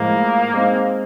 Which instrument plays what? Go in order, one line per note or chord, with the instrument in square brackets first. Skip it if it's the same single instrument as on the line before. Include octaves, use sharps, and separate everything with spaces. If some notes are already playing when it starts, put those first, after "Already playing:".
Already playing: [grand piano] A2 F3 G#3 [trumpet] A#3
[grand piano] G#3 C4 D#4